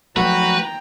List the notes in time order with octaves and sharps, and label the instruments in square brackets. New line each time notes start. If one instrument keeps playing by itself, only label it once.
[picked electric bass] F3 F#3 A3 [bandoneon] F#4 [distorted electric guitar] B4 [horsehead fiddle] G5 A#5